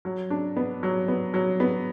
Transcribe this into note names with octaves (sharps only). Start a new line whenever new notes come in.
F#3
D4
B3
F#3
B3
F#3
B3